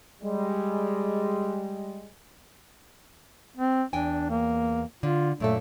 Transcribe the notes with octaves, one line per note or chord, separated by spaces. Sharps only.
G3 G#3
C4
E2 D4 G5 G#5
A#3
D3 F4
F#2 A#2 A3 A4